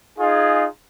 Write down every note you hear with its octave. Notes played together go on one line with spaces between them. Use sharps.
D#4 F4 G#4